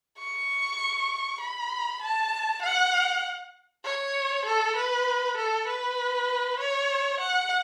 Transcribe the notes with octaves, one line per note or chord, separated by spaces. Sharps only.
C#6
B5
A5
F#5
C#5
A4
B4
A4
B4
C#5
F#5